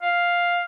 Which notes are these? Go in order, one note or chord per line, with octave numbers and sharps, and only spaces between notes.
F5